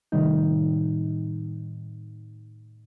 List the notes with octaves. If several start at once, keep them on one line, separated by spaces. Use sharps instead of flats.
A2 C3 D#3 G3 D#4